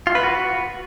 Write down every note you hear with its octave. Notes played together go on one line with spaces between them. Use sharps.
F4
B4
F#4